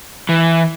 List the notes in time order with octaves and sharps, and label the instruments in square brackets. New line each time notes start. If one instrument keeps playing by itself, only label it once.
[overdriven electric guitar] E3